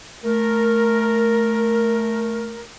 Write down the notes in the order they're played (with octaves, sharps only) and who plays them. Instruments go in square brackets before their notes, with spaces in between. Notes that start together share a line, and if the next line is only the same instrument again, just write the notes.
[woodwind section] A3 A#4